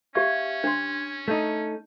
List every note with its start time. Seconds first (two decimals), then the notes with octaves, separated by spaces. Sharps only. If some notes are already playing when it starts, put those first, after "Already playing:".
0.15 C#4 G4 E5 F5 C#6 G#6
0.64 D4 C6 G#6
1.28 A3 D#4 A5 G6